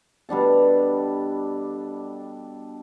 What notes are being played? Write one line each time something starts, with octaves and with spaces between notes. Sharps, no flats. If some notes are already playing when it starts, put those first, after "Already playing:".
B2 G3 D4 A4